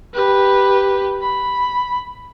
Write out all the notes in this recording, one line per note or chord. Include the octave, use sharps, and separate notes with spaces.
G4 B4
B5